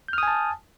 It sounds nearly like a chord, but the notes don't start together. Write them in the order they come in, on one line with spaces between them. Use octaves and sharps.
G6 F6 D#6 G#5 A5